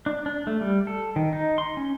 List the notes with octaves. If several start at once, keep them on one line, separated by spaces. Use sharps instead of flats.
D4
D4
A3
G3
A4
D#3
D#4
C6
C#4